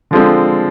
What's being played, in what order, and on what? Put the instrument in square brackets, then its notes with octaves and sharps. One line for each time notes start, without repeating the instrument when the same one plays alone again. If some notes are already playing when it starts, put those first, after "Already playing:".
[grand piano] D3 F3 G#3 C4